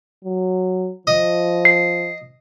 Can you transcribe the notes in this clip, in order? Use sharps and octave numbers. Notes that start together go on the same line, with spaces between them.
F#3
F3 D#5
C7